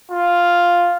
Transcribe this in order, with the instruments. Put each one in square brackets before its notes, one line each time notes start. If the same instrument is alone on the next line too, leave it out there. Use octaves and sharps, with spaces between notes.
[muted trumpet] F4